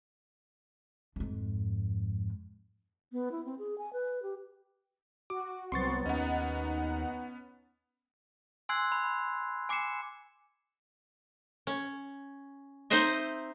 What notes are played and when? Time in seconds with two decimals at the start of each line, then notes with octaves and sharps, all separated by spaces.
1.16 F2 G#2
3.12 B3
3.32 E4
3.45 C4
3.59 G#4
3.78 G#5
3.93 B4
4.23 G4
5.30 F#4 D6
5.72 C2 F#3 B3 C4 C6 C#6 A6
6.06 D#2 B3 C#4 D#4 F#5
8.69 G#5 C6 E6 F#6 G#6 C7
8.92 B5
9.69 G#5 D6 C7 C#7 E7
11.67 C#4
12.90 C4 D#4 C5 D#5 E5